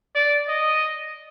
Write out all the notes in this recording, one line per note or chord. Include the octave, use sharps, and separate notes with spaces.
D5
D#5